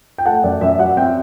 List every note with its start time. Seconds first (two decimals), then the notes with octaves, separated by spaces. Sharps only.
0.18 G5
0.26 A3 F#5 A5
0.44 F#2 D5
0.61 F#2 E5
0.79 F#3 D5 F#5
0.97 C4 E5 G5